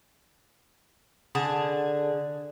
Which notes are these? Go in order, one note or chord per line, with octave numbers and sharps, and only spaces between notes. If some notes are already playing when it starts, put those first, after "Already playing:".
D3 G#4 A5